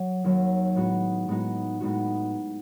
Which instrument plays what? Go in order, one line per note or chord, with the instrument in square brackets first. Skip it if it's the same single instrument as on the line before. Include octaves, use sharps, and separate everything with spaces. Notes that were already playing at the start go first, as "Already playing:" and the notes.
Already playing: [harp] F#3
D#2 D#3 F#3
A2 G#3 B3 D#4 F#4
A2 G#3 B3 D#4 F#4
A2 G#3 B3 D#4 F#4